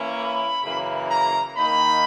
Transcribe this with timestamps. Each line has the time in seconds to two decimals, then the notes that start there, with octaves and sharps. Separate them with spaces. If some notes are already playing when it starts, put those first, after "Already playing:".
Already playing: E3 A#3 C#4 E4
0.16 B5
0.63 F#2 C#3 E3 A#3
1.11 A#5
1.57 D#3 A#3 D#4 B5